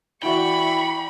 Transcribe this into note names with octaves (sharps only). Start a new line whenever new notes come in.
E3 E4 F#4 D5 G5 B5 C#6